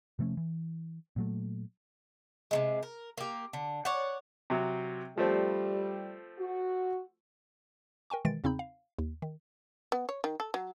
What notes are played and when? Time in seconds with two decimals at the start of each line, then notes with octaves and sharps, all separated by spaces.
0.19 C3 F3 A3 C#4
0.37 E3
1.16 A#2 F#3 A3
2.51 C3 D#3 G#3
2.83 A#4
3.18 A#3 G4
3.53 D3
3.85 C#5 D5 F#5
4.50 C3 F#3
5.18 F3 G3 A3 C4
6.39 F#4
8.10 A#4 G5 G#5 C#6
8.25 B2 D#3 E3 G#3 A6 D7
8.44 E2 C#3 C4 D#4 B5 G6
8.59 F5
8.99 D#2
9.22 D#3
9.92 B3
10.09 C#5
10.24 D#3
10.40 A4
10.54 F#3